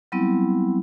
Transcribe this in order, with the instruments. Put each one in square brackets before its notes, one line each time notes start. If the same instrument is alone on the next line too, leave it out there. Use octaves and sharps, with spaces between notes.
[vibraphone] F#3 G3 B3 C4 E4